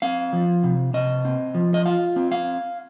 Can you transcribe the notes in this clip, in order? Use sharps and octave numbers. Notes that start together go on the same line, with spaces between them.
C4 F5
F3
C3
C3 D#5
C4
F3
D#5
F4 F5
C4
F5